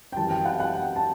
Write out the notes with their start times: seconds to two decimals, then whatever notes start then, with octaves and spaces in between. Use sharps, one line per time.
0.12 G5
0.16 F#2 E3 G3 A5
0.31 G5
0.45 F#5
0.60 F#5
0.74 G5
0.96 A5